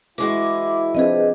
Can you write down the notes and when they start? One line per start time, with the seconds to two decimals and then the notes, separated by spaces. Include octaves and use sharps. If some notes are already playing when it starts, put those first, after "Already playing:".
0.18 E3 G#3 E4 F#4 D6
0.95 F3 C4 D4 G#4 B4 D#5